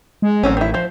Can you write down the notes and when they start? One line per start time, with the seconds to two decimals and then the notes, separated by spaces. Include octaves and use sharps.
0.22 G#3
0.43 A1 F#3 C4 C#4
0.57 D#3 E4
0.74 F3 C5